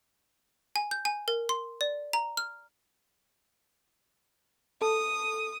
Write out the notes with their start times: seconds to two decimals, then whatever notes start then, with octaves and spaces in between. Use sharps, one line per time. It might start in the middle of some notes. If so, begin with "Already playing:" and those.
0.76 G#5
0.91 G6
1.05 G#5
1.28 A#4
1.49 C6
1.81 D5
2.13 A#5
2.37 F6
4.82 A4 D#6